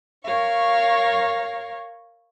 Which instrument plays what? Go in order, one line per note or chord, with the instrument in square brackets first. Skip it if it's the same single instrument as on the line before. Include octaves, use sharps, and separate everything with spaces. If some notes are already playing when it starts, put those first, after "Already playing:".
[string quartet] A#4 C#5 F5 C#6